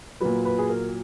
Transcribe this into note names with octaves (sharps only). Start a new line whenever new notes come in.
A#2 F#3 B4
B4
G#4
A#4